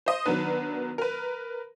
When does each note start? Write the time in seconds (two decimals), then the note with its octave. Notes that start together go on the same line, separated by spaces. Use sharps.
0.06 C5 D#5
0.26 D#3 F#3 B3 D4 B4
0.98 A#4 B4